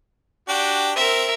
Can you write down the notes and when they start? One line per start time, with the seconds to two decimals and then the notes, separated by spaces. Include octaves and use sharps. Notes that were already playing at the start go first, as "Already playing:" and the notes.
0.48 D4 F#4 G4
0.96 C4 A#4 E5